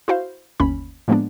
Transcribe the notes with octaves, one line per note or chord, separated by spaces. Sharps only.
E4 F#4 C5 F5
G1 D#2 C#4 B5
A2 F3 G#3 A#3 B3 D4